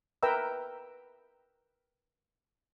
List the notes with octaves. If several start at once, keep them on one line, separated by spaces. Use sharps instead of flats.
A#4 B4 E5 G5 A#5 E6